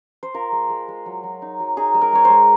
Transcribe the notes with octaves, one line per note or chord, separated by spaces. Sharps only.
C5
F4 A#4
G#3
G#3
G#3
F#3
F#3
D#4
F#3
D#4 G#4
G#3
A#4
G#3 C#5
C5
G#3